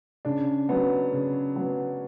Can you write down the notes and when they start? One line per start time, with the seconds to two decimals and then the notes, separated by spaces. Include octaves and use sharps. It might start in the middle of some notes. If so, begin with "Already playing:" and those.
0.25 C#3 D4
0.69 F#3 B3
1.13 C#3
1.56 F#3 B3